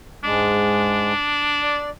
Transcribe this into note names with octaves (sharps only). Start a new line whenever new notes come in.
G#2 G#3 D4
D5